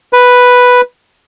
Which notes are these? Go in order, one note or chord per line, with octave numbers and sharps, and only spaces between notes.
B4